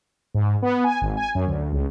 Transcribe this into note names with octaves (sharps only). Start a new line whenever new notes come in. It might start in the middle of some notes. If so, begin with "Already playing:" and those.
G#2
B3
G#5
G#1
G#5
F#2
D2
C#2